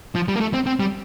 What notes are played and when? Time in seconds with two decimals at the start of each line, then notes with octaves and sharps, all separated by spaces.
0.15 F3
0.28 G3
0.36 A#3
0.41 A3
0.54 C4
0.66 C4
0.80 G3